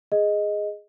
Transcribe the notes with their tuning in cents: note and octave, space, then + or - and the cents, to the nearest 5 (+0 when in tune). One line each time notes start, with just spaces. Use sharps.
G#4 -5 D#5 +0